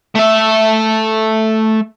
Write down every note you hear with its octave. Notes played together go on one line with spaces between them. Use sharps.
A3 E5